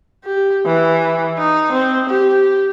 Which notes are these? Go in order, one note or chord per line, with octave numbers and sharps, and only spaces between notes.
G4
E3
D#4
C4
G4